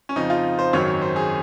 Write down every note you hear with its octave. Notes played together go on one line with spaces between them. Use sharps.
C#4
F2 C#3 F3 D#4
F4
C5
G#1 F#2 D#3 F#3 C#5
C5
G#4